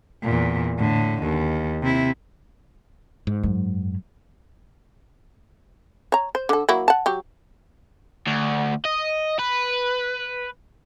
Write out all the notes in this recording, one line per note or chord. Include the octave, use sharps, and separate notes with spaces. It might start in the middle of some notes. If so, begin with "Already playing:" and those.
E2 A#2
A2 D3
D#2
C3 E4
G#2
F#2
C#5 A#5
C5
D3 A4
F#3 A#3 E4
F#5 A5
F#3 G4
D2
D#5
B4